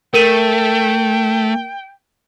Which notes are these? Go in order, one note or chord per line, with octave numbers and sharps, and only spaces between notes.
A3 A#4 G5 D#7